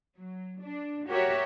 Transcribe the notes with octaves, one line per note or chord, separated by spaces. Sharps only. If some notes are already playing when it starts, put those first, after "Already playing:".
F#3
D4
F#4 G4 A#4 C#5 E5